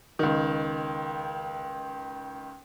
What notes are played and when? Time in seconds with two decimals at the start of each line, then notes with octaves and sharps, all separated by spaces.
0.19 C#2 D#3